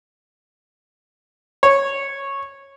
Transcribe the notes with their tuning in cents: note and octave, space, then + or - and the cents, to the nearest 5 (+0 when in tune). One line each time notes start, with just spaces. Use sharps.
C#5 -10